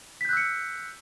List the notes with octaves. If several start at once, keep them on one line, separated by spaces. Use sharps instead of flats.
E6 F#6 G6 B6 C#7